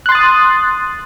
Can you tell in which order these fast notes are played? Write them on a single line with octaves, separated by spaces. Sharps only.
F#6 C6 A6 D#6